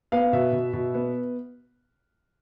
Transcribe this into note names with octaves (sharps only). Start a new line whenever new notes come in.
B3 F5
B2 E5
B2
B2
B3